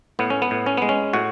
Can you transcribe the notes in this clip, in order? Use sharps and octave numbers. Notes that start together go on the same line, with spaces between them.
A2 B3
C#4
B3
A2
C#4
G#3 B3
C#4
A2 F#4